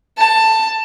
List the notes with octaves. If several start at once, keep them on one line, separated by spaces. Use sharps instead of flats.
A5